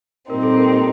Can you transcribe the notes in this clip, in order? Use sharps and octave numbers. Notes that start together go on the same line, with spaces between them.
A#2 G3 C4 D#4 A#4
A4
A#4